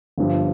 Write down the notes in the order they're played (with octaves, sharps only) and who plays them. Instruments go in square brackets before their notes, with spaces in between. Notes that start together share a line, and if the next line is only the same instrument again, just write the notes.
[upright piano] G1 G2 F3